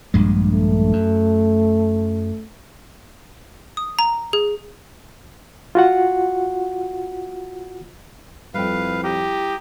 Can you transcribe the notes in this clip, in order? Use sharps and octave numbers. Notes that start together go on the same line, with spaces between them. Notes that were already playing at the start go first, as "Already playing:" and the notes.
A#1 G2 G#3
A3
F#2
D#6
A#5
G#4
F4 F#4 F#5
F2 G3 E4 B4 F5 G5
G4 A#5 D#6